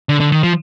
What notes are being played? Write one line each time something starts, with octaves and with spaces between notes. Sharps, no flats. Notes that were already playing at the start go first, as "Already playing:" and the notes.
D3
D3
D#3
F3